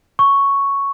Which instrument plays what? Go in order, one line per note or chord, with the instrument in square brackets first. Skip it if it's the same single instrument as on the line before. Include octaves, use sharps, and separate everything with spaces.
[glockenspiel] C#6